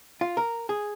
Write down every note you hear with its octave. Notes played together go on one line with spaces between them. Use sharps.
F4
A#4
G#4